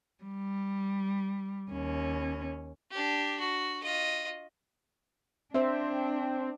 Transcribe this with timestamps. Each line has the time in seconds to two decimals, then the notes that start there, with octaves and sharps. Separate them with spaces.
0.24 G3
1.72 D#2 C#4
2.91 D4 G4
3.40 F#4
3.83 F4 D#5
5.54 C4 D4 C5 E5